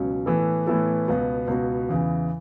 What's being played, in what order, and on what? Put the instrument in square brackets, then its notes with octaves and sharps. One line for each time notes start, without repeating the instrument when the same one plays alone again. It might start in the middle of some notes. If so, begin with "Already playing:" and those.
Already playing: [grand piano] C#2 B2 F#3 C#4
A2 E3 B3 E4 A4
A2 E3 B3 E4 A4
C#2 B2 B3 F#4
C#2 B2 B3 F#4
E2 C#3 E3